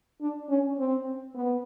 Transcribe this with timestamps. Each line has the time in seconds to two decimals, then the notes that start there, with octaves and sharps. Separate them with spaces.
0.21 D4
0.49 C#4
0.78 C4
1.35 B3